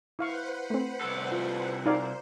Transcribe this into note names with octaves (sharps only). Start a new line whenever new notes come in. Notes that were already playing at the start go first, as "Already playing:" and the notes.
E4 B4 C5 F5 F#5 C#6
A3 C4
C2 A4
F4
D#4 F4 A#4 C5 D5 F5